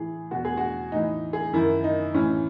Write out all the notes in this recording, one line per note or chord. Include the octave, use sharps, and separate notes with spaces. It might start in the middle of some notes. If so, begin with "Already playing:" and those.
Already playing: A2 E3 G#4
E2 B2 F#4
G#4
F#4
A2 E3 D#4
G#4
F#2 D#3 E4
D#4
A2 E3 C#4